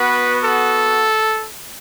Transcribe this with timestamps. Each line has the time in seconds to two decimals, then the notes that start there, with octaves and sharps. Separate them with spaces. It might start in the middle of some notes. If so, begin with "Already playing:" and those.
Already playing: B3 F#4 B4
0.44 A4